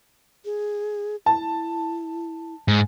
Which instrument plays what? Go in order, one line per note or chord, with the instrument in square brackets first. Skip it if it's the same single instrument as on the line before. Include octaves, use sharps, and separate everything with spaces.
[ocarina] G#4
[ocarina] E4 [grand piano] A5
[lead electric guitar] G#2